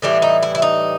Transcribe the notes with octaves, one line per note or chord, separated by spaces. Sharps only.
A2 E3 G3 D4
D#4
E4
E4
D#4